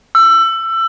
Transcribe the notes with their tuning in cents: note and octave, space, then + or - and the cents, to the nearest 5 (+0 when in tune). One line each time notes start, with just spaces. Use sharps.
E6 +25